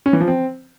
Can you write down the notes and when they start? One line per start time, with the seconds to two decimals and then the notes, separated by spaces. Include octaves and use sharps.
0.06 C#4
0.13 E3
0.20 F3
0.28 C4